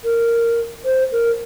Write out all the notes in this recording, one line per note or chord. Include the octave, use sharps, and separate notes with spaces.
A#4
C5
A#4